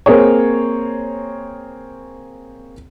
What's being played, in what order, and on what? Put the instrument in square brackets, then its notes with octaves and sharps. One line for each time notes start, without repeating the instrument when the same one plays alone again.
[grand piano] A#3 C4 G#4 C#5